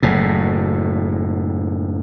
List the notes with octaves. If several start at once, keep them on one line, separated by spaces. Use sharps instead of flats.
F#1 A2